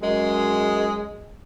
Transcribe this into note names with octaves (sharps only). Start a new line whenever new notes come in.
F#2 G#3